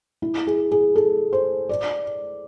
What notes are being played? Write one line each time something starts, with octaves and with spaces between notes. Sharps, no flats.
E4
G#4
G#4
A4
C5
D5